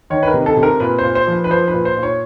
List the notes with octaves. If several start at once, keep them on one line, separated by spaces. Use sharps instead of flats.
D#3 C#5
B4
A#4
C3
A4
C3
A#4
A#2 B4
A#2 C5
C5
F3
B4
B4
F3 C5
B4
A#2
C5
A#2
C#5